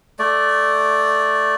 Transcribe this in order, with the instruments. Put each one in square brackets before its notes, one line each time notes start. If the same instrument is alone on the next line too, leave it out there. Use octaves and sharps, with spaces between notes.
[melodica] A3 D5